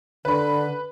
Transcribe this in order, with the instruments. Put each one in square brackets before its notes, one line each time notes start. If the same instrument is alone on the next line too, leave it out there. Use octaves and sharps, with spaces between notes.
[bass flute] D3 [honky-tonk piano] B4 B5